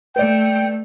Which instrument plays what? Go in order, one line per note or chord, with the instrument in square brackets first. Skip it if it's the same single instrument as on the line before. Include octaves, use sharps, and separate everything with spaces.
[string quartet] A3 [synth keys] B4 D5 [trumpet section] G5